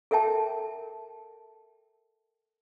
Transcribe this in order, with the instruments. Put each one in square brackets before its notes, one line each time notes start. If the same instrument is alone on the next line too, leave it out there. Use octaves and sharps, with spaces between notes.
[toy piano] A4 A#4 E5 G5 A5